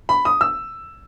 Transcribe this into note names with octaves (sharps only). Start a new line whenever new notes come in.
B5
D#6
E6